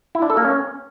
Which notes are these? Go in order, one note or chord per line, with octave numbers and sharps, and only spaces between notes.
E4
D4
A4
A#3
C#4